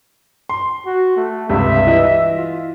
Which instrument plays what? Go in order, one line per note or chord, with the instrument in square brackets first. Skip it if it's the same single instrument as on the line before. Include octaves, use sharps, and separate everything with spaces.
[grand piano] C6
[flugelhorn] F#4
A3
[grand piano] C#2 G2 C3 [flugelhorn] E5
[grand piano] E3 D#5
[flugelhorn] F4